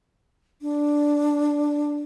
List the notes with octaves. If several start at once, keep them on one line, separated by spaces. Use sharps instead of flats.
D4